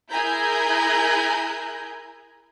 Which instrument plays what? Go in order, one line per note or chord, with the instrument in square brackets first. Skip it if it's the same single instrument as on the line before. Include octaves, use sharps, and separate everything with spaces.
[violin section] E4 G#4 A#4 G#5 A#5 G6